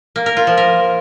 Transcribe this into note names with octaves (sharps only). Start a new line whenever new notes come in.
A#3
A#4
F4
F3
A#4